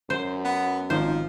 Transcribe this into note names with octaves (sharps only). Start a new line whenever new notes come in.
F#2 C5
B3
G#1 F3 D#4 C5